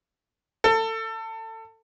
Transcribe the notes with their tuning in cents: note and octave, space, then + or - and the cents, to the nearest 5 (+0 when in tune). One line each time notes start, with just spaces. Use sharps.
A4 +25